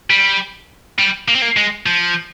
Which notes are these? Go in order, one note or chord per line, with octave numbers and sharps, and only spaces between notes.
G3
G3
A#3
C4
A#3
G#3
F3